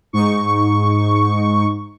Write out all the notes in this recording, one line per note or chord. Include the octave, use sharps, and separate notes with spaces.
G#2 D#4 C#6